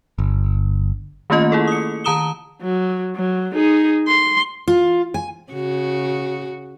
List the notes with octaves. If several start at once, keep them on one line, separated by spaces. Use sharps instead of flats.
G1
D#3 A3 A#3 C#4 F4 D#5
E4 G#4 A4
D#6 C#7
D#3 A5 A#5 D#6 E7 G7
F#3
F#3
D#4 G#4
C6
F4
G#5
C#3 F#4